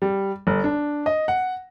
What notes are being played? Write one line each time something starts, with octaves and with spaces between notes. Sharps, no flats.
G3
G1
D4
D#5
F#5